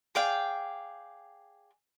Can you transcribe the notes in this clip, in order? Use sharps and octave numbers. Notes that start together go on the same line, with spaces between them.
G#4 D5 F5 G5